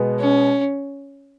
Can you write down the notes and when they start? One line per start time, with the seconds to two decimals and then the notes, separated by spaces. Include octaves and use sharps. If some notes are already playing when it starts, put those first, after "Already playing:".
Already playing: B2 G#3 B3
0.20 C#4